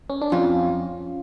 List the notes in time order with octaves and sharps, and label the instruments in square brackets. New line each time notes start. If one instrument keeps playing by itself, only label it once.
[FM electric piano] C#4
D4
[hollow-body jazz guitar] F2 [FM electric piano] C#4 F4